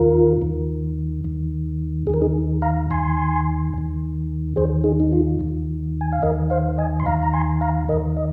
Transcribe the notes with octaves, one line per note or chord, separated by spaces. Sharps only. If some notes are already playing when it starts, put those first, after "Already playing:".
Already playing: D#2 D#3 F4 A#4
D#2 D#3
D#2 D#3
D#2 D#3 G#4 A#4
D#4 G#4
F5 A#5
D#2 D#3 G#5 C6
D#2 D#3
D#2 D#3 G#4 C5
D#4 G#4
D#4
F4
D#2 D#3
G#5
F5
D#2 D#3 A#4 D#5
C5 F5
D#5 G#5
C6
D#2 D#3 F5 A#5
A#5
G#5 C6
F5 A#5
D#2 D#3 A#4 D#5
D#5